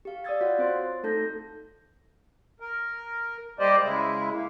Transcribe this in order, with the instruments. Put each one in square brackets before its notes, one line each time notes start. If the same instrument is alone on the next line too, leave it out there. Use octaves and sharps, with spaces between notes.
[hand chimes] G4 F5
D5 F5 D#6 E6 G#6 A6
F4 F#4 C#5 D#5 F5 F#5
C4 C5 C6 A6
A3 D#4 A4 A5 G6 A#6
[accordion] A#4
G3 A#3 G4 C5 D5 D#5
C#3 G#3 E4
A#3